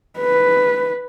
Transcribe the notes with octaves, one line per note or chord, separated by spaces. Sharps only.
B4